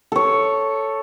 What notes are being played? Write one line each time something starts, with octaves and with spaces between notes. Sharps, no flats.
A4 C#5